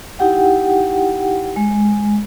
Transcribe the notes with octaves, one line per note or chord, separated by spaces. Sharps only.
D#4 E4 G4 F#5 G5
G#3